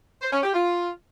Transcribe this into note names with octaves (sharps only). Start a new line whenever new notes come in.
C5
C#4
G4
F4